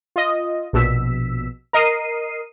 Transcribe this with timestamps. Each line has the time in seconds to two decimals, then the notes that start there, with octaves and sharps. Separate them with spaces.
0.16 F4 D#5
0.73 A#1 B2 E6 B6
1.73 A#4 D#5 C7 D#7